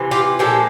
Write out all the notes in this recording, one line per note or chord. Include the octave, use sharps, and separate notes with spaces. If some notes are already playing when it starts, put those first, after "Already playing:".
Already playing: C3 E3
F4 G4
A#2 F3 G#3 G4 A4